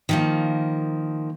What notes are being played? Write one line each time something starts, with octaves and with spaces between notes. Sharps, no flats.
D#3 F3 A#3